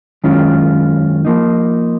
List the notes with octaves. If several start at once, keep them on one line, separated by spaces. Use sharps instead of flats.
F#2 D#3 G#3 C#4 F4
F3 A#3 D#4